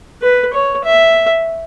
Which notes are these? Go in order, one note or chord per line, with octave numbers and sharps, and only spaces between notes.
B4
C#5
E5